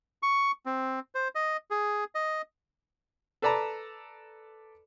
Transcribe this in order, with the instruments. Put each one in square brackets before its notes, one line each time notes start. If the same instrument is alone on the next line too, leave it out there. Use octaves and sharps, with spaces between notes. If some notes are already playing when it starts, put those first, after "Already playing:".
[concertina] C#6
C4
C5
D#5
G#4
D#5
[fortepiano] A4 B4 D5 A5 A#5